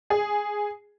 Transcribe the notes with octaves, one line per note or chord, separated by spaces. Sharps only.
G#4